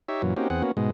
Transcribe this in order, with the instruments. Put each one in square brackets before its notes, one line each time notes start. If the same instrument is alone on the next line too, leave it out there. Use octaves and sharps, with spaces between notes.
[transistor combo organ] D#4 G4 C#5 E5
F#2 A#2 E3 F#3
A#3 C4 C#4 D#4 F#4 G4
E2 C4 G#4 F#5
A#3 B3 C#4 F#4
G#2 B2 G#3